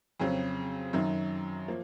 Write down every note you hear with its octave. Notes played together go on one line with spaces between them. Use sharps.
F2 C#3 F#3 C4
F#2 D#3 F#3
F3 A#3